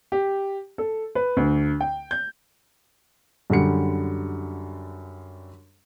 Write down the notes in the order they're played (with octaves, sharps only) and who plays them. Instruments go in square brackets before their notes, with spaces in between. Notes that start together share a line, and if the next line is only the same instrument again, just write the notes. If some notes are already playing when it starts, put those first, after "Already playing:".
[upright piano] G4
A4
B4
D2
G5
G6
[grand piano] F#2 D3 G3 C#7